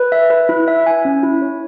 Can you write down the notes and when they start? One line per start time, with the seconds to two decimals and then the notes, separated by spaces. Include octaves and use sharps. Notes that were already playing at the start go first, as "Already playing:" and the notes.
Already playing: B4
0.12 E5
0.30 B4
0.49 E4
0.68 E5
0.86 G#5
1.05 C#4
1.23 E4
1.42 C#5